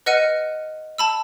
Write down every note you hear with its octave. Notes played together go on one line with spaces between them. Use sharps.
B4 D#5 F#5 F6 C#7 D#7
A5 B5 E6